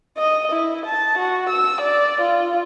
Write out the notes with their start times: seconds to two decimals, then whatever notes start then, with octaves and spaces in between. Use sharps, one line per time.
0.18 D#5
0.52 E4
0.86 A5
1.18 F#4
1.50 E6
1.81 D5
2.21 F4